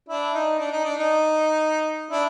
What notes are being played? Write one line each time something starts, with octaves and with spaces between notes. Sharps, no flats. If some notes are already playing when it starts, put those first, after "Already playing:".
D4 E4
D#4
D4
D#4
D4
D#4
D4 E4